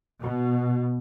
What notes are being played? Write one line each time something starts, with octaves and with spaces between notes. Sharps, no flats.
B2